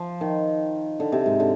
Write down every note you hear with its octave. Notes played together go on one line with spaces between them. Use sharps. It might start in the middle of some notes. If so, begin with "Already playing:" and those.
Already playing: F3
D#3
D3
C3
G#2
D3